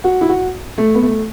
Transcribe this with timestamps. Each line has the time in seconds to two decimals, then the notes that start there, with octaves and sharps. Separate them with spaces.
0.04 F#4
0.21 E4
0.29 F#4
0.78 A3
0.95 B3
1.03 A3